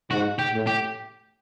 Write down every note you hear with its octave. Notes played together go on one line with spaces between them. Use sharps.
G#2 F#4
G4
A2
G4